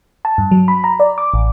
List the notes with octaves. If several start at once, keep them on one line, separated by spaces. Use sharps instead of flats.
A5
G2
F#3
B5
A#5
D5
D6
A1